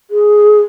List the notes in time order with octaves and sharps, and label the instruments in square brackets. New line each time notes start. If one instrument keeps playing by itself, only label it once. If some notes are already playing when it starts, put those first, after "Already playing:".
[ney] G#4